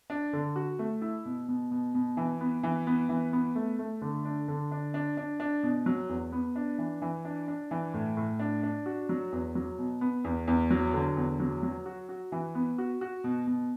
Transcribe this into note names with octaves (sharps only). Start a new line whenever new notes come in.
D4
D3
F#4
A3
E4
B2
B2
B2
B2
E3
B3
E3
B3
E3
B3
A3
A3
D3
D4
D3
D4
D4
D4
D4
B2
F#3
E2
B3
D4
E3
E3
D4
D4
E3
A2
A2
D4
D4
F#4
F#3
E2
F#3
B2
B3
E2
E2
F#3
D3
E2
F#3
F#3
F#4
F#4
E3
B3
F#4
F#4
B2
B2